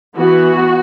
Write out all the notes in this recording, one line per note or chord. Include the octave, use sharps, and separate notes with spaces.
E3 B3 F#4